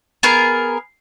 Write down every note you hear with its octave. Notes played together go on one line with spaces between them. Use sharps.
B3 G#4 A#4